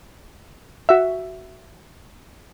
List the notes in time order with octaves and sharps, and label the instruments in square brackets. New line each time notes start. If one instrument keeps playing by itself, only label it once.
[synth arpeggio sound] F#4 E5